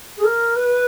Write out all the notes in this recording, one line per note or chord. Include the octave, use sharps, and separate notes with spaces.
G#4
A#4
B4